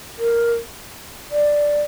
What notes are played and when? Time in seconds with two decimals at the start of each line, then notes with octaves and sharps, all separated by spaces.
0.18 A#4
1.31 D5